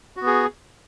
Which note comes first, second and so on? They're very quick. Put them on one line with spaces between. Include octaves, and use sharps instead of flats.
F#4 B3 G#4